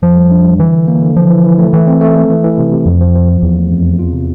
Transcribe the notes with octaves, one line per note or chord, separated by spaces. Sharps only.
F2 F3
G3
D4
G3
D3 E3
D3
A#3
D3
E3 F3
E3
E3
A3
E3 A3
C4
A3
A3
E3
E3
C3
C3
F2 F3
F3
F3
F3
E2 E3
A3
F2
C4
F4
C3